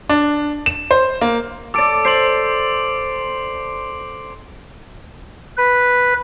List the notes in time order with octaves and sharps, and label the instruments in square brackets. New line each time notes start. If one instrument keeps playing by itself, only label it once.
[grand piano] D4
E7
C5
A#3
[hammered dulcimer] A4 D5 [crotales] D6 D7
[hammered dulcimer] C5 [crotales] C7 D7 F#7
[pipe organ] B4